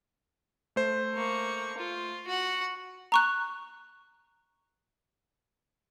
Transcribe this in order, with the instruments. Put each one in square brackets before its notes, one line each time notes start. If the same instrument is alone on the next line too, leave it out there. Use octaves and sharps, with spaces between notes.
[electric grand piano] A3 C5
[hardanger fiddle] A#3 C#6
F4
F#4 F#5
[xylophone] A#5 C#6 F#6